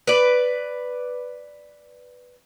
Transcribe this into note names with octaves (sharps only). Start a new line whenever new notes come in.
B4 D5